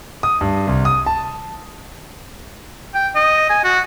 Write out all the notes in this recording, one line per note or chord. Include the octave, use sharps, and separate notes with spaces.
D#6
G2
C2
D#6
A5
G5
D#5
G#5
F#4